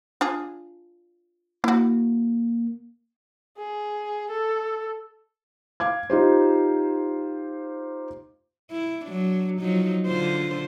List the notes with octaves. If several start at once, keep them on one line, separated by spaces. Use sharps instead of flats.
D4 F4 G#4
A#3 E4 F#4
G#4
A4
F5 D6 G#6
D#4 F4 G4 C5
E4
F#3 D4
F3 F#3 D#4
D3 F4 C5